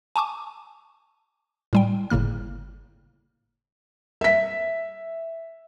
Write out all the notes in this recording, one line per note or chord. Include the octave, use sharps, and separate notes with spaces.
G#5 A5 C#6 D6
A2 G3 G5
G1 A2 C#3 A#3 F6
E5 B6